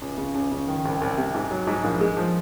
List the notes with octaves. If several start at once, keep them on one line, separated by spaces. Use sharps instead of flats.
C#2
C#3
C#2
C#3
D#3
C2
C2
C3
G#2
F#3
G#2
A#1
G#3
F3